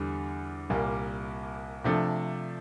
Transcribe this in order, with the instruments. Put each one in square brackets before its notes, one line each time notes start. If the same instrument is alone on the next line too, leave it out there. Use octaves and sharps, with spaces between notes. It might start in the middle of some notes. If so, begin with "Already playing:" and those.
Already playing: [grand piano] E2 D3 G3
C2 A#2 G3 A#3
C3 F3 A3 D4 A4